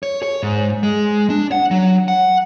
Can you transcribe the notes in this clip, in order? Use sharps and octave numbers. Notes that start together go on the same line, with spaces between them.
C#5
C#5
G#2
G#3
D4
F#5
F#3
F#5